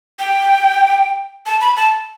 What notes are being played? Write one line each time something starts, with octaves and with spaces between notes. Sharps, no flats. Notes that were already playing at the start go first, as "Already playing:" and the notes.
G5
A5
B5
A5